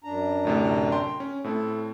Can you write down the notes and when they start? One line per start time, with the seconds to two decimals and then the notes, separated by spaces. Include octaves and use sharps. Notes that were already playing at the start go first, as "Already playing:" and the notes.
0.04 F#2 D4 A#5
0.45 D2 A2 C3
0.92 G5 C6
1.20 C#4
1.44 A2 C4 E4 A4